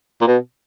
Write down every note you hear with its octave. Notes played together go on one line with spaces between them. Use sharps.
A#2
B2